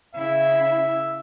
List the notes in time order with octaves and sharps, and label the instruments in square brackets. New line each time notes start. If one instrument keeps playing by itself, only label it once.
[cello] C#3 E4 [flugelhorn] E5